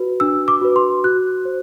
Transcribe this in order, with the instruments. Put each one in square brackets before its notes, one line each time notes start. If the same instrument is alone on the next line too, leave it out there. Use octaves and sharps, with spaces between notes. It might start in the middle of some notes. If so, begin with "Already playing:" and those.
Already playing: [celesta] F#4 B4
D4 E6
D6
F#4 B4
C6
F#4 F#6
C5